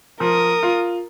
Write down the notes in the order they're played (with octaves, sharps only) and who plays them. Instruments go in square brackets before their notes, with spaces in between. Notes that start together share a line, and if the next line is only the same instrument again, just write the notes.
[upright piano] F3 [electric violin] A#4 D#6
[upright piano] F4